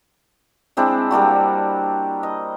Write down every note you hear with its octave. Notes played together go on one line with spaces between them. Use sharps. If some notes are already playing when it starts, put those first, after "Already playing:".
G#3 C4 D4 E4
G3 A#3 D4 F#4
D#5